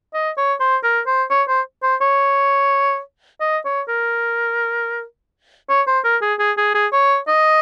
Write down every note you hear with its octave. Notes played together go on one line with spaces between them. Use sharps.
D#5
C#5
C5
A#4
C5
C#5
C5
C5
C#5
D#5
C#5
A#4
C#5
C5
A#4
G#4
G#4
G#4
G#4
C#5
D#5